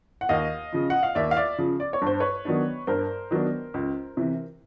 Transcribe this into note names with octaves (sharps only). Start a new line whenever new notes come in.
F#5
D#2 D#5 F5
C#3 F3
F#5
F5
D#2 D5 E5
F5
D5 E5
C#3 F3
D5
C#5
G2 C5
B4 C#5
D#3 F#3 B3 D4
G2 A#4 C5
D#3 F#3 B3 D4
C#2
C3 E3